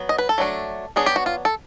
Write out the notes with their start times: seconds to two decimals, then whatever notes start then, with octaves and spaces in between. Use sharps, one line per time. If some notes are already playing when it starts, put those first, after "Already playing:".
Already playing: F#3 B3
0.09 D#5
0.18 B4
0.29 A4
0.38 F#3 A3 D4
0.96 F#3 B3 D4 G#4
1.06 G4
1.16 F#4
1.26 F4
1.45 A4